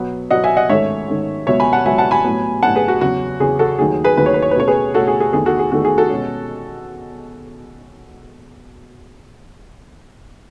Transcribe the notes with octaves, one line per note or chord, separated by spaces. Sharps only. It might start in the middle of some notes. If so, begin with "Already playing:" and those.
Already playing: B2 F#3 B3
B2 F#3 B3 D#5 F#5
E5 G#5
D#5 F#5
G#2 D#3 A3 C#4 C#5 E5
G#2 D#3 A3 C#4
C#2 B2 F#3 B3 C#5 E5
G#5 B5
F#5 A5
C#2 B2 F#3 B3 E5 G#5
F#5 A5
G#5 B5
A2 F#3 B3
A2 F#3 B3 F#5 A5
G#4 B4
F#4
E2 C#3 F#3 C#4 F#4
E2 C#3 F#3 C#4 G#4
F#4 A4
D#2 D#3 F#3 A3 G#4
G#4 B4
D#2 D#3 F#3 A3 B4
C#5
B4
C#5
B4
B2 A3 C#4 C#5
G#4 B4
B2 A3 C#4 F#4 A4
G#4
G#4
E2 D#3 A3 G#4
F#4 A4
G#4
E2 D#3 A3 F#4
G#4
F#4 A4
B2 G#3 C#4